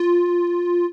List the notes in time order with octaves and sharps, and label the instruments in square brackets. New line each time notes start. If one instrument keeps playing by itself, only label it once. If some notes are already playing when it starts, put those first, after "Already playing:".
Already playing: [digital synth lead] F4